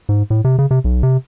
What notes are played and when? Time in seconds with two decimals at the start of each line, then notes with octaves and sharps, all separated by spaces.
0.09 G#2
0.30 A2
0.44 C3
0.59 C#3
0.71 C3
0.84 B1
1.03 C3